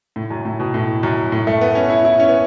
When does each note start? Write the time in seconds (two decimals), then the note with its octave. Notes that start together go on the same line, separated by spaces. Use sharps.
0.16 A2
0.30 F#2
0.45 A2
0.60 B2
0.74 A2
1.03 F#2
1.32 A2
1.47 A3
1.61 B3
1.75 C#4
1.90 E4
2.05 E4
2.20 C#4
2.29 B3